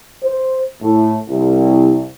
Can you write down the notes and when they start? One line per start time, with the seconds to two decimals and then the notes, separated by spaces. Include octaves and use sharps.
0.22 C5
0.81 A2
1.29 C2